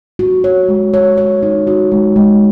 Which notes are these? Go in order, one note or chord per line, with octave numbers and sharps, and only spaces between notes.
F#4
C#5
G#3
C#5
C#5
D#4
F#4
G#3
G#3